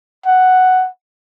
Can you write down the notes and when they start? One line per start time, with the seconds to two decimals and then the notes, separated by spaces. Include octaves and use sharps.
0.26 F#5